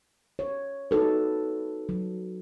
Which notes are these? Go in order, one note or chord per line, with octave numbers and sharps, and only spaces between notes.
C#5
D#4 F#4 A4 B4
F#3